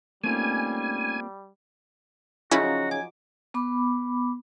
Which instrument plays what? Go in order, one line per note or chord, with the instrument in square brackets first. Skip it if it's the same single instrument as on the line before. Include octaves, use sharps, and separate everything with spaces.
[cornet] G3 [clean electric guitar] A3 C#4 D#4 [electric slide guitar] A#3 C4 F4 [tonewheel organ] G#5
[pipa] C#3 [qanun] F3 F#3 D#4 [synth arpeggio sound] C#4 E4 [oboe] F#4
[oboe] G#5 [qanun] D6
[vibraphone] B3 B5 D6